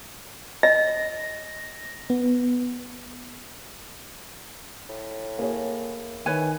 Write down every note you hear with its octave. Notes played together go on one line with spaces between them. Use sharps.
D#5 A#6
B3
A2
A#3 G#4 C#5
D#3 E4 B4 C#5 G#5